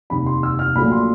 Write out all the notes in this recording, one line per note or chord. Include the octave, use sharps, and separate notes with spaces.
F1 D#2 D#3 B5
C6
E6
F6
A#1 A#2 F#3 A3 B5
C6